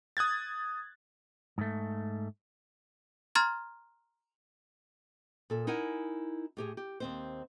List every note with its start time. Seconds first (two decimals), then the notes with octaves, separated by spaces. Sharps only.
0.17 D#6 F#6 G#6 A6
1.58 G#2 A3
3.35 A#5 C6 F6 G#6 A6
5.50 A#2 A4
5.67 D#4 E4 A#4 F#5 G#5
6.57 A2 G4 G#4
6.77 G4
7.00 D#2 C4 C5